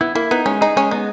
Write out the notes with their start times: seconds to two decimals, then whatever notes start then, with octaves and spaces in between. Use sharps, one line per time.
0.01 B3 E4
0.15 A#3 E4
0.31 B3 D#4
0.46 G#3 C#4
0.61 D#4 G#4
0.76 G#3 C#4
0.91 B3 D#4